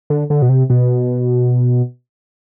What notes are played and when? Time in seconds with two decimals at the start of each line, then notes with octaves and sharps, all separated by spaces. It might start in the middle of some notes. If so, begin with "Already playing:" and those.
0.10 D3
0.30 D3
0.42 B2
0.49 C3
0.70 B2